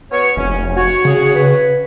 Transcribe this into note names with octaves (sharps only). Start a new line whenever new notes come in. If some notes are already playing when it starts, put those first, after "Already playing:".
B3 F#4 C#5
F1 C#4
F#4 C#5
C#3 G#4
B4